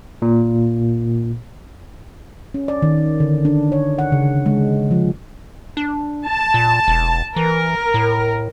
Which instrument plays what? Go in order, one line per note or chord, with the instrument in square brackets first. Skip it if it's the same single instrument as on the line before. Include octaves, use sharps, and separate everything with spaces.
[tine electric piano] A#2
[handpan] C#4
D5
D#3
D3
D4
C#5
F#5
C#3
G#3
F3
[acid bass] D4
[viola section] A5
[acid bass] A#2
E1
[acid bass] E3 [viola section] A#4
[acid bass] A2